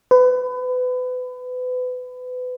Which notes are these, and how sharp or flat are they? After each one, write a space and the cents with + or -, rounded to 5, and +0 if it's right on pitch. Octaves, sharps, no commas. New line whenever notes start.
B4 +30